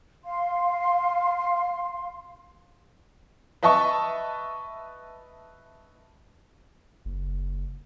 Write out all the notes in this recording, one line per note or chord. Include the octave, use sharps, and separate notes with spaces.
F5 C6
B4 D#5 E5 A5 C#6
F#1